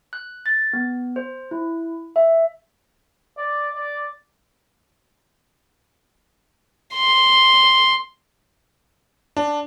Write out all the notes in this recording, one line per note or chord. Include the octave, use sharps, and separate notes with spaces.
F#6
A6
B3
C5
E4
E5
D5
D5
C6
D4